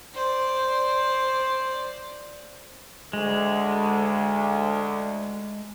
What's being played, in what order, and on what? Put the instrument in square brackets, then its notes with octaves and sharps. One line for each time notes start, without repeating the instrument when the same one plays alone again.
[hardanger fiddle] C5 D5
[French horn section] D2 [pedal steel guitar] G#3